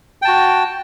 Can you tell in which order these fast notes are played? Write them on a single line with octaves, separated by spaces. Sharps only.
G5 A5 F#4